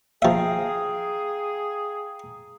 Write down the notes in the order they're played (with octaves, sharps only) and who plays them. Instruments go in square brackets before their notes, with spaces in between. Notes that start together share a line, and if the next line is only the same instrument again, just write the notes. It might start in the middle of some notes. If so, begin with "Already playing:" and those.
[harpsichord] F3 E5 [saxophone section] G#4 [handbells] F5 G5 A#5